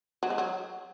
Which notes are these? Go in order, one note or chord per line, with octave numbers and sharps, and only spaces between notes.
F#3
G#3
F#3